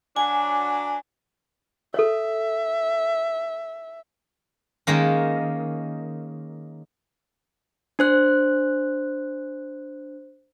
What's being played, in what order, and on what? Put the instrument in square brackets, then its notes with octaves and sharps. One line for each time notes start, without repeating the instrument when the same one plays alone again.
[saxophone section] F#3 D4 [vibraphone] G#5
[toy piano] A4 C#5 [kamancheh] E5
[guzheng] D#3 G#3 A#3 C#4
[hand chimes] D4 C5 F#6